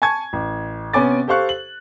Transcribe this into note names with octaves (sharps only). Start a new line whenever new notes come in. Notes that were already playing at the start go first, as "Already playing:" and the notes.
G#5 A5 C#6 G#6
A1
C3 B3 C#4 G#5 D6 A6
G4 A4 C5 F5 C#6 F#6
F#7